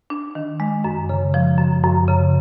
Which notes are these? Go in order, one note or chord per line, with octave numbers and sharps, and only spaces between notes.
D4
D#3
G#3
F#2
C#3
F3
F#2
F#2
C#3